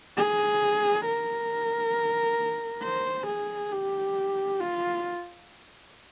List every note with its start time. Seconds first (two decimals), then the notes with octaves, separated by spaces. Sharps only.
0.17 G#4
1.05 A#4
2.83 C5
3.27 G#4
3.72 G4
4.60 F4